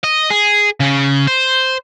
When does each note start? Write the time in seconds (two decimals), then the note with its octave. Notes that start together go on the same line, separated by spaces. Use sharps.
0.03 D#5
0.30 G#4
0.80 C#3
1.27 C5